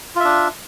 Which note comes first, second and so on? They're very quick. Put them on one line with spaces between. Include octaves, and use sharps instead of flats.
F4 E5 D4